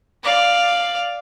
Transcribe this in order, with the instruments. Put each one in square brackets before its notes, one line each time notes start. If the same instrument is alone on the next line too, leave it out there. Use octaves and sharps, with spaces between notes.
[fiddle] D5 F5